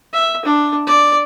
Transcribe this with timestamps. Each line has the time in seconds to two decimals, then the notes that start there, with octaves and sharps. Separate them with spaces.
0.13 E5
0.45 D4
0.87 D5